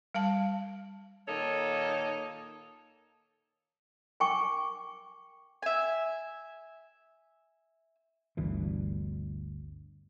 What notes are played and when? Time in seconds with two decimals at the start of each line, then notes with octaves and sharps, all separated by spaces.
0.14 G3 F5 A5
1.28 A#2 D#3 A#3 A4 C#5 D#5
4.20 A#4 G5 G#5 C#6 D6
5.62 E5 G#5
8.37 G1 D2 E3